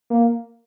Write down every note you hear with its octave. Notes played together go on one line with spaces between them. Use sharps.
A#3